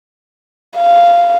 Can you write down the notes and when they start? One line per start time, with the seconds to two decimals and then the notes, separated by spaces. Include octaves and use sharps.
0.77 F5